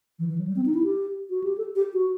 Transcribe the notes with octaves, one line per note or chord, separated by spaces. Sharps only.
E3
E3
F#3
G3
C4
D#4
E4
G4
F#4
G4
A4
G4
F#4